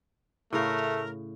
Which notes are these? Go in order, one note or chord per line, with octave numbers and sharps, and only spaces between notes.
A2 C#3 A3 A#4 F5